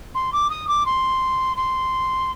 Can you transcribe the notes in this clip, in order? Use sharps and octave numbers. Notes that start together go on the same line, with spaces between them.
C6
D6
D#6
D6
C6
C6